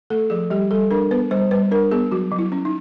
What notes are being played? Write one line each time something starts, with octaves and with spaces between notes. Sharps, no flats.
A3 A4
F3 G#4
G3 G4
G3 A4
D4 A#4
B3 B4
G3 C5
G3 B4
D4 A#4
B3 G#4
F#3 F#4
F#3
E4
C#4
D#4